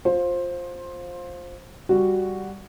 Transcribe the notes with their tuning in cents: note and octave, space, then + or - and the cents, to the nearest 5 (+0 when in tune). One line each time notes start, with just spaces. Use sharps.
F4 +20 C5 +15
G3 +0 F#4 +0